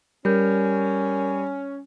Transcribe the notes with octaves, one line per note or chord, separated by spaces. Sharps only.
G3 C#4 A#4 G6